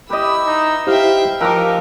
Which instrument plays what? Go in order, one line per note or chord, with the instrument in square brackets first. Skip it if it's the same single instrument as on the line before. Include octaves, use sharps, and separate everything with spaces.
[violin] E4 E6 [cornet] G4 [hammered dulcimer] B4 D#5
[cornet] D#4
[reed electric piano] E4 G4 C5 [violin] E5 G5 [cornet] F5
[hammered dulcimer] F3 D6 [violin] D#4 G4 [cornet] A#4 [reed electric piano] G5 E6 F#6